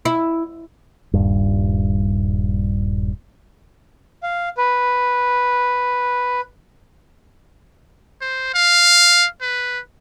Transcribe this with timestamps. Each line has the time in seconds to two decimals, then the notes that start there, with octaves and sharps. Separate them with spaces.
0.05 E4
1.14 D#1 G2
4.23 F5
4.58 B4
8.21 C5
8.54 F5
9.41 B4